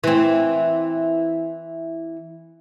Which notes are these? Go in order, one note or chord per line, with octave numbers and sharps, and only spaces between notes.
E3 C4